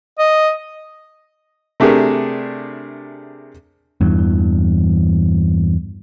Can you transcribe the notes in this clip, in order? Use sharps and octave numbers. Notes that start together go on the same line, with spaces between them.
D#5
C3 A3 D4 G4 G#4 A#4
E2 G2 E3